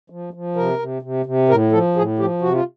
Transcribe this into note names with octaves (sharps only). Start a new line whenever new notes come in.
F3
F3
C3 A#4
C3
C3
C3
A2 A#4
F3 A4
A2 G#4
F3 G4
C3 F#4
F4